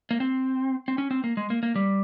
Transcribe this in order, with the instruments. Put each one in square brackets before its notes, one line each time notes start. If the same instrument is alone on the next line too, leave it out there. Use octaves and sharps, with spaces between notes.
[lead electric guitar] A#3
C4
C4
C#4
C4
A#3
G#3
A#3
A#3
G3